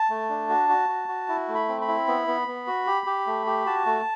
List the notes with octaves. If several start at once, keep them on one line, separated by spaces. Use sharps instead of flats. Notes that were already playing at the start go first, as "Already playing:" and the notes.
Already playing: A5
A3
D4
F#4
F#4
F#4
F#4
E4
A3
B5
C4
B5
E4
B3
B3
B3
F#4
G4
G4
A3
G4
F#4 A5
A3